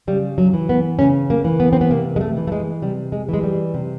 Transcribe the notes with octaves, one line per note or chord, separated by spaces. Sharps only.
C#3 G3
F#3
E3
B3
C#3 C#4
A#3
E3
B3
C4
B3
C3 A#3
G#3
A3
E3
A3
G#3
C3 G3
G#3
E3 G#3
G3
C3